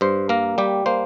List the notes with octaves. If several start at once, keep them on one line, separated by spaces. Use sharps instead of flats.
G2 C5
A#3 A#4
G3 G4
A#3 C5